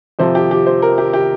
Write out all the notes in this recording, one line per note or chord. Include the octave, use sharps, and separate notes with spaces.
F2 C3 F3 C5
G4
G4
C5
A#4
G4
G4